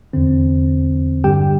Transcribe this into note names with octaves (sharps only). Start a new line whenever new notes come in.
E2 D3 C4
G2 D3 G3 G4 G5